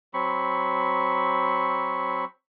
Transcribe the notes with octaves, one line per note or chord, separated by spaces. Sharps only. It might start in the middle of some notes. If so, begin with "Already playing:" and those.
F#3 C4 B5 C#6